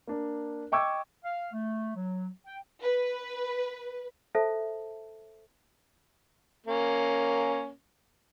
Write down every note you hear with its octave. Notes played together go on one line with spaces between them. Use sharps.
A#3 D4
D#5 G5 C#6 D6 E6 G#6
F5
A3
F#3
G5
B4
A4 C5 E5 A5
A#3 C#4